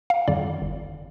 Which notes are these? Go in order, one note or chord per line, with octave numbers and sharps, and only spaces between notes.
F5
F2 D#3 G3 D5
G1